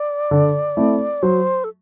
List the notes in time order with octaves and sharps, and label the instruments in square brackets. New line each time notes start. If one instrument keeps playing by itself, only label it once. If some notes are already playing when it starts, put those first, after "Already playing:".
Already playing: [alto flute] D5
[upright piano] D3
A3 C4 E4
[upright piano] F#3 [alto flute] C5
[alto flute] A4